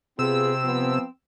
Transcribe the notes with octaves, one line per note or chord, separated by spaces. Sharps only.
C3 B3 C4 F4 G#4 E6
F3 B3